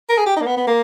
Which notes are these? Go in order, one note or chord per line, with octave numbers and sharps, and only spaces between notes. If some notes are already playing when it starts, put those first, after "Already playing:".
A#4
G#4
G4
D#4
A#3
B3
B3
A#3